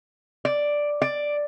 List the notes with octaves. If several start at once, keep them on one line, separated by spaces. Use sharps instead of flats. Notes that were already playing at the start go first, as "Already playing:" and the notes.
D5
D5